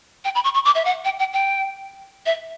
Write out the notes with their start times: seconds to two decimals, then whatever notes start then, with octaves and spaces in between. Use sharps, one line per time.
0.25 G5
0.35 B5
0.44 C#6
0.54 C#6
0.65 D6
0.75 E5
0.85 F#5
1.05 G5
1.19 G5
1.33 G5
2.26 E5